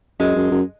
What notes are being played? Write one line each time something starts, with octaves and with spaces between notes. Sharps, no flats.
F#2 G#3
F#2
F#2